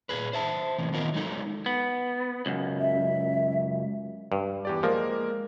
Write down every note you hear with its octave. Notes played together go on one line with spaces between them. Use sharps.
A#2 C#3 G#4 B4
C5 E5 A5
A2 C3 E3
D#3 B3 D#4 F4 A#4
F#3 G#3 D#4 A4
B3
C#2 F#2
E5
G2
E2 G4 D5
F3 G#3 A#3 A#4